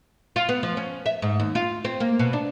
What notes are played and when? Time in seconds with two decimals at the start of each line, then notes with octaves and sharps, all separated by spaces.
0.36 F4
0.49 B3
0.63 F3
0.77 C#4
1.06 E5
1.22 G#2
1.40 D#2
1.55 F4
1.85 C4
2.00 A#3
2.19 B2
2.33 D4